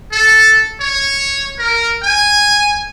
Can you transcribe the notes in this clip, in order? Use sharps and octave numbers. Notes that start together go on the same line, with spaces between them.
A4
C#5
A#4
G#5